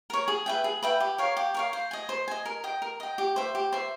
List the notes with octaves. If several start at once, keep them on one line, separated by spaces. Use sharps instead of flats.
A#4 C#5
G#4
B4 E5 G5
G#4
B4 E5 G5
G4
A#4 C#5 F5
G4
A#4 C#5 F5
C5
D#5 G#5
C5
D#5 G#5
A#4
D#5 G5
A#4
D#5 G5
G4
C5 E5
G4
C5 E5